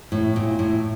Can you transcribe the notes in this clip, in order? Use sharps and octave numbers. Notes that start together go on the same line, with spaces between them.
A2
A#2
A2